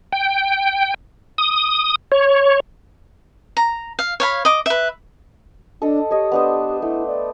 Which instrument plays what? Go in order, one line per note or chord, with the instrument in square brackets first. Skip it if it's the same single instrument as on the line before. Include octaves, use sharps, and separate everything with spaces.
[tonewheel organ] G5
D#6
C#5
[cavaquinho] A#5
F5
C#5 F5 B5
D#5 D6
B4 E5
[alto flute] D4 [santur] A4 D#5
[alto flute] G4 [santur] C#5 D#5
[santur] B3 D4 C5
[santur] A3 [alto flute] E4
[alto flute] D5